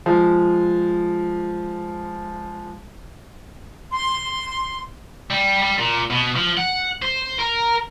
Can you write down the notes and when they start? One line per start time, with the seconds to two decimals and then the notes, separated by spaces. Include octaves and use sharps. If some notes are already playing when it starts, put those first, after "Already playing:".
0.06 F3 G#3
3.91 C6
5.31 G3
5.62 G3
5.79 A#2
6.10 B2
6.36 F3
6.57 F#5
7.02 C5
7.39 A#4